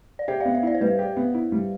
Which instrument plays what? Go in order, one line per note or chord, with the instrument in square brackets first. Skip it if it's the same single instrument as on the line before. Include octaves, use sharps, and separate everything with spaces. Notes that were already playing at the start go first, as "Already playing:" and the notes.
[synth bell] D5
[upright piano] G4 [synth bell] C5 E5
[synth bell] D5 F5
[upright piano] B3
[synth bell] C5 E5
[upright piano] E4 [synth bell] D5
[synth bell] C5
[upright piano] G3 [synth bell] B4 D5
[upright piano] G4
B3
E4
G3